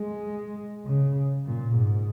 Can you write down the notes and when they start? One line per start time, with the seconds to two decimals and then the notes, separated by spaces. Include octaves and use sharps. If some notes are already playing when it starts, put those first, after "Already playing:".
Already playing: G#3
0.85 C#3
1.47 A#2
1.76 G#2